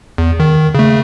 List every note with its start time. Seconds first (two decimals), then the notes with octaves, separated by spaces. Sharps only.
0.18 E2
0.40 D#3
0.75 C#3 A3